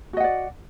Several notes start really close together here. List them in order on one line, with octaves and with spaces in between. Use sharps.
F#4 D#5 F#5 D5